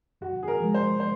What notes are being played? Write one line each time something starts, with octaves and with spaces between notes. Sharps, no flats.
F#2 F#4
G#4
A#4
F3 G#3
C5
C5